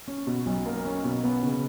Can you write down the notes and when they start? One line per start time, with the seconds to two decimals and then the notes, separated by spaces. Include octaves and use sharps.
0.08 C#4
0.27 B2
0.46 B1
0.66 A#3
0.85 C#4
1.04 B2
1.24 B3
1.43 C#3